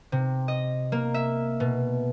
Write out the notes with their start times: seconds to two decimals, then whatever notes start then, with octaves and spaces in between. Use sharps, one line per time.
0.12 C3
0.48 D#5
0.92 A#3
1.14 E5
1.60 B2